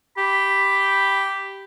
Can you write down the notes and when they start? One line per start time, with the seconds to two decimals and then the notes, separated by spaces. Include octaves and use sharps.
0.17 G4 B5